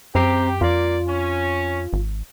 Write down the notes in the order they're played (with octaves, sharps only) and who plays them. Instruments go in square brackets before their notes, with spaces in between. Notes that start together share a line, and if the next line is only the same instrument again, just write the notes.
[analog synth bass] F#2 [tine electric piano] C4 A#5 C7 [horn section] G4
[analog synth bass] F2 [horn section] A#3 D5 [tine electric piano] F4
[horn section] C#4
[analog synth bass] G#1